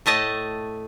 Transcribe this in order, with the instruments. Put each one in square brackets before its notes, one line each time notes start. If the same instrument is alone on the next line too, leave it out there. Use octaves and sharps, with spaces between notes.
[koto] A2 A3 D#5 A5